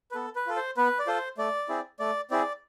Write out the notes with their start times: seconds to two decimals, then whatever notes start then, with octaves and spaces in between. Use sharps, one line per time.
0.11 B4
0.15 B3 A4
0.36 B4
0.47 F4 A4
0.56 C5
0.77 B3 B4
0.99 D5
1.07 F4 A4 C5
1.38 A3 D5
1.69 C4 E4 G#4
1.99 A3 D5
2.31 C4 E4 G#4 D5